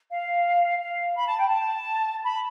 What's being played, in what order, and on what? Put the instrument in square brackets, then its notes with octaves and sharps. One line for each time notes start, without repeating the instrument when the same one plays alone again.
[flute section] F5
F5
B5
A5
G5
A5
B5